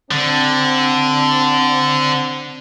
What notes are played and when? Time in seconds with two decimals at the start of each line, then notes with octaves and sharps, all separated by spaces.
0.11 D3 C4 D4